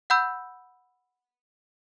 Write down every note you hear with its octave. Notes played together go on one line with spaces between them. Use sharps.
F#5 B5 E6 G6